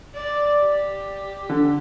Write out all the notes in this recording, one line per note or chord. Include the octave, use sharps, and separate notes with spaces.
D5
G4
D3